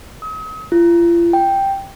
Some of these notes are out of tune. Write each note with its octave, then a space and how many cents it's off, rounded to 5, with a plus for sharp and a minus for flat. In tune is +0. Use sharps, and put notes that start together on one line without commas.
D#6 +40
F4 -40
G5 +0